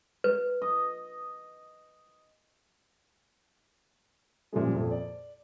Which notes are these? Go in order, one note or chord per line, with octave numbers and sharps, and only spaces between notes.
B4
D#5
F#2 A#2 F3 G3 G#3
F2 A#2
D5